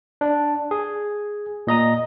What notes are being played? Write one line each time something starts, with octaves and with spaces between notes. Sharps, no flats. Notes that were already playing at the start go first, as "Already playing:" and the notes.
D4
G#4
A#2 D#5 A#5 D#6